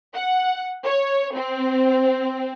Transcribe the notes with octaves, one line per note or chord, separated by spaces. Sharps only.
F#5
C#5
C4